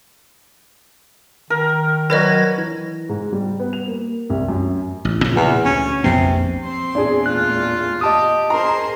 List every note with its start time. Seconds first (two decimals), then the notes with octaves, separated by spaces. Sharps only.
1.50 D#3 A#4
2.10 F#3 F#4 A#4 B4 D5 D#5 G#6 A#6
2.58 E3
3.09 G#2
3.33 G3
3.60 B3
3.73 F7
3.88 A#3
4.30 C2
4.48 F#2
5.05 A1
5.24 A#2 C#3 F3
5.36 E2
5.65 D2 C#4
6.04 A#1 F2 C3 B3
6.64 C4 C5 C6
6.95 E2 A#2 A3 D4 G#4
7.26 F4 F#6
8.01 G4 D#5 A5 D#6
8.50 G#4 A#4 C5 A#5 C6